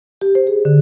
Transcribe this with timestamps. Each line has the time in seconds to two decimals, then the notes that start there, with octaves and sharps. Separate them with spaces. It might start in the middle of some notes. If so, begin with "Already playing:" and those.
0.21 G4
0.35 C5
0.47 G#4
0.65 D3